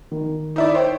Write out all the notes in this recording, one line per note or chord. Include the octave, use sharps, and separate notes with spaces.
D#3
D#4 E4 D5
C5 C#5 G5